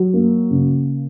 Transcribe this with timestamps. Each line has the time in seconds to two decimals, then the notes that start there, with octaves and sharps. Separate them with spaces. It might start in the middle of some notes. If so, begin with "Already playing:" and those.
Already playing: F#3
0.14 A#3
0.51 C#3